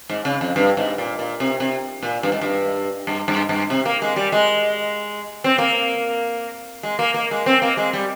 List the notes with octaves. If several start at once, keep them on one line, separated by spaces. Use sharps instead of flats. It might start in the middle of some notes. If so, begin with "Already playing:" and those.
G#2
C#3
F2
G2
G#2
A#2
A#2
C3
C3
A#2
G2
G#2
G2
G2
G2
G2
C3
A#3
G#3
G3
G#3
C4
A#3
G#3
A#3
A#3
G#3
C4
A#3
G#3
G3